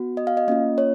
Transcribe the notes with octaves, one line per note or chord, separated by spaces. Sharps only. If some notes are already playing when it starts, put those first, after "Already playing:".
Already playing: B3 F#4
D#5
F5
D#5
A#3 C#4 F4 D#5
C#5